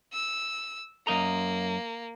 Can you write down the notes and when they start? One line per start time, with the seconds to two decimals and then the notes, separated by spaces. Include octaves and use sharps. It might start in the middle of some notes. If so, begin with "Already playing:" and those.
0.13 E6
1.07 F#2 A#3 D#5 A#5